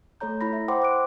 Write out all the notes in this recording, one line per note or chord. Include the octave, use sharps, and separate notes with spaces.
A3 A4 C#5 A#5 G6
E4 B5 A#6
E5
C5 F#5 G5 B5 C6 D6
D6 F#6 D7